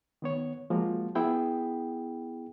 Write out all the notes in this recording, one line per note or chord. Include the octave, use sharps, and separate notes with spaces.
D#3 B3 C#5
F3 G#3 A#3 F#4
B3 E4 G#4 G5